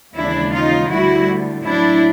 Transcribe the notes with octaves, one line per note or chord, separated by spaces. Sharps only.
D#2 C#3 E3 G#3 D4 E4
D#4 F4
D2 D3 G3 E4 F#4
A2 F#3 D4 E4